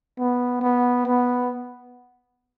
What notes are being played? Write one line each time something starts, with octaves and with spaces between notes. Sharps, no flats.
B3
B3
B3